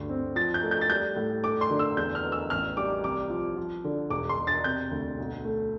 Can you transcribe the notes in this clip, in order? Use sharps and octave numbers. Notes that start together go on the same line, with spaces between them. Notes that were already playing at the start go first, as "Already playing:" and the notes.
Already playing: D2 G2
C4
F3 A6
G6
A3
G6
A6
G3 G6
A2
A3 D6
C6
D3
E6
E2 G6
F6
B3
E6
A1 F6
G3 D6
C2 D6
F3
F3
D3
E1 D6
C6
E1
A6
C3 G6
D2
B1
A3